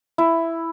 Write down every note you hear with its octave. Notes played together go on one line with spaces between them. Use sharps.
E4